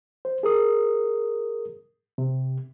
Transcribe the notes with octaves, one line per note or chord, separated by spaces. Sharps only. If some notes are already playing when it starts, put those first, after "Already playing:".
C5
G#4 A#4 D#6
C3